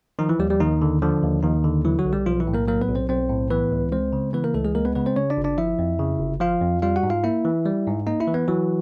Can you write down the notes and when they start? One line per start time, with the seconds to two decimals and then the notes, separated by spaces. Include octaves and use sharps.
0.19 D#3 F3 D#4
0.29 E3 E4
0.39 D#2 G3 G4
0.50 G3 G4
0.60 D#2 D#3 D#4
0.82 D3
1.02 D3 F3 D4
1.23 D#2
1.43 D#2 D#3 D#4
1.64 D3
1.85 E3 F#3 E4
1.99 F#3 F#4
2.05 B1
2.13 G3 G4
2.26 B1 F3 F4
2.40 E3 E4
2.47 A2
2.54 A#3 A#4
2.67 F#3 A#3 A#4
2.81 B3 B4
2.89 B1
2.95 C4 C5
3.09 B1 C4 C5
3.30 A2
3.50 E3 B3 B4
3.72 C#2
3.92 G#3 C4 C5
4.13 C#3
4.33 E3 B3 B4
4.44 A#3 A#4
4.54 C#2 A3 A4
4.65 G#3 G#4
4.75 G#3 A#3 A#4
4.85 B3 B4
4.95 C#3 B3 B4
5.06 C4 C5
5.16 C#3 C#4 C#5
5.30 D4 D5
5.38 G1
5.44 D4 D5
5.58 F3 E4 E5
5.79 F2
5.99 C#3
6.20 G1
6.40 F3 F4 F5
6.61 F2
6.82 G3 F4 F5
6.96 F#4 F#5
7.03 G#2
7.10 F4 F5
7.24 A#3 E4 E5
7.45 E3
7.65 G3
7.87 G#2
8.07 A#3 D#4 D#5
8.20 E4 E5
8.27 E3
8.34 B3 B4
8.48 E3 F#3 F#4